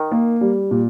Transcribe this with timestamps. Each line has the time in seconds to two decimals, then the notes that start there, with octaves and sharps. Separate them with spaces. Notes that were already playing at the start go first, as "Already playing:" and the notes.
Already playing: D#3
0.12 A#3
0.41 G3
0.71 A#2